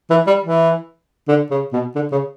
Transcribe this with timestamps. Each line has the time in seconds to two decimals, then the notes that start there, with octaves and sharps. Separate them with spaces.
0.10 E3
0.27 G3
0.44 E3
1.28 D3
1.51 C#3
1.72 B2
1.95 D3
2.12 C#3